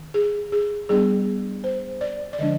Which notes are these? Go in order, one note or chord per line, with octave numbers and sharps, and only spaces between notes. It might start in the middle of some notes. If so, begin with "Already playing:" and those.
Already playing: D#3
G#4
G#4
G3 B3 D4 G#4
C5
D5
D5
D3 F3 G#3 D4 D#5